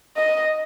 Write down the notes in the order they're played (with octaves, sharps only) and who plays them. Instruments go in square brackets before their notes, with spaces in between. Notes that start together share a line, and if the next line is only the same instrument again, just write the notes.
[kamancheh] D#5